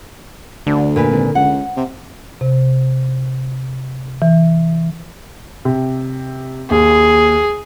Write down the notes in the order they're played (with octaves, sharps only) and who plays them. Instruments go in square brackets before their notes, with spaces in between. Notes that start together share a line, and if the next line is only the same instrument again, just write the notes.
[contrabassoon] D2 [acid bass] D3
[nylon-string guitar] A#2 B4 G#5
[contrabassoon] G#1
[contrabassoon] C#2 [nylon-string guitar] F#5
[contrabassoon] C3
[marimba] C3
E3
[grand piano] C3
[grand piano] D#2 [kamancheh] G#4